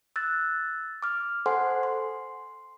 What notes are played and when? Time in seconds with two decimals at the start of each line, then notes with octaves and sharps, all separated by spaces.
0.16 E6 F#6 A6
1.03 D6 F6
1.46 A4 C5 F#5 G#5 C6
1.83 C6